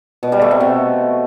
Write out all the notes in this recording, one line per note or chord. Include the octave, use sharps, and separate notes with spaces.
B2
G3
A3
C3
B2